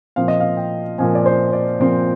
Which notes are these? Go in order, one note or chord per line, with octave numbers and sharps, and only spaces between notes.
A#2 F3 C4 F5
D#5
F5
G5
A#2 F3 C4 G#5
D5
C5
D5
A#2 F3 C4